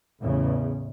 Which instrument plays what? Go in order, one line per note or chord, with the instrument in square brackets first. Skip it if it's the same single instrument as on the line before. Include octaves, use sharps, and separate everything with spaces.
[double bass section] A1 E2 C#3